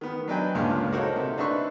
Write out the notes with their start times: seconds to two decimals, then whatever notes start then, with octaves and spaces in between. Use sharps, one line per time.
0.01 D#3 B3
0.28 F#3 D4 B4 D#5 G5 G#5
0.55 C#2 G2 A#2 C#3 G#3 C#4
0.92 D#4 F#4 A4 A#4 C5 C#5
1.16 C3
1.38 D4 D#4 B4 E5 C6 C#6